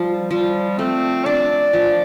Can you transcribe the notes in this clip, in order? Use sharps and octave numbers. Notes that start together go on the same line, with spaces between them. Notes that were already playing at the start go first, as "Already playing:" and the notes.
Already playing: F3 G3
F3 G3
A3 C4
D4 D5
F3